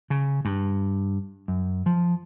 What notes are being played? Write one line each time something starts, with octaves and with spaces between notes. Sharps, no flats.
C#3
G2
F#2
F3